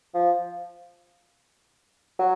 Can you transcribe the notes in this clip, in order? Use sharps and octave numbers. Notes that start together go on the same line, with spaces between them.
F3
F#3